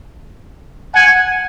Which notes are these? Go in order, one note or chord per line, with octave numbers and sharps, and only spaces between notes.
F#5 G#5